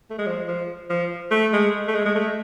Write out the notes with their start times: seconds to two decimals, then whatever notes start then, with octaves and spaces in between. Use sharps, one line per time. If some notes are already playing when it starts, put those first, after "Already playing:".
0.10 A3
0.18 G#3
0.26 F3
0.47 F3
0.90 F3
1.31 A3
1.53 G#3
1.87 A3
1.94 G#3
2.05 G#3
2.15 A3